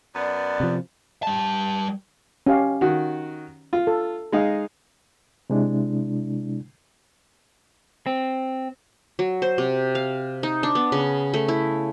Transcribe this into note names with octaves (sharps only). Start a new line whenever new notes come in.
F#2 B3 D5
C3 F3
G3 A5
C#4 G4 F5
D#3 F#4
F4
A4
G#3 D#4 F5
C3 G#3 D4 E4
C4
F#3
C5
C3
F5
D#4
D4
B3
C#3
A3
E4